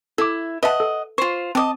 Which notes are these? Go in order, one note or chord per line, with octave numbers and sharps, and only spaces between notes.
E4 A4 D6
B4 D#5 E5 F#5 A5
A4
F4 C5 C#6
C4 D#5 A5 D6 D#6